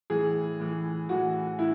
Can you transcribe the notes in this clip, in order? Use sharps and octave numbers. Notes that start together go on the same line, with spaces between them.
A2 E3 G#4
A2 E3
A2 E3 F#4
A2 E4